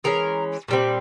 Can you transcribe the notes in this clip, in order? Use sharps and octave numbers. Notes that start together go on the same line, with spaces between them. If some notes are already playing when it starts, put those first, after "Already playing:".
E3 G#3 C#4 A#4
A#2 G3 C4